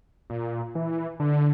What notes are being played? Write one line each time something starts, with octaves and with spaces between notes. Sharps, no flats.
A#2
E3
D3